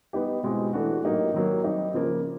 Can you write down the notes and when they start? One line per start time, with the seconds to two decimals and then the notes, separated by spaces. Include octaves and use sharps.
0.13 G3 B3 D#4 G4
0.43 B2 G#3 C4 E4 G4
0.73 E3 A3 D4 F#4
1.04 A2 F#3 A#3 D#4 G4
1.34 D#3 F#3 A#3
1.64 G3 C4 D#4 G4
1.94 C#3 F3 A#3